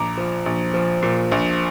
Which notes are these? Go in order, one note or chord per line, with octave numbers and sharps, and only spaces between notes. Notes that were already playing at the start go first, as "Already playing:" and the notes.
Already playing: A#1 A#5 D6
F3
A#1
F3
A#2
A#1